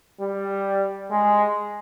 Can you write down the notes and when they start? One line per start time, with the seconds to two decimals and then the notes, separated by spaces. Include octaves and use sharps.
0.20 G3
1.11 G#3